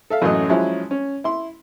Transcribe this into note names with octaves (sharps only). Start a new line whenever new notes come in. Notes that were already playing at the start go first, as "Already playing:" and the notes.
A4 E5 F5
A1 F#2 F#3 A3 D#5
F3 F#3 G#3 C#4 E4
C#4
E4 C6